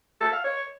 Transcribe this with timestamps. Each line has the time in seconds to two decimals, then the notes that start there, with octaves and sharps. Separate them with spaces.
0.21 A4
0.32 F5
0.44 C#5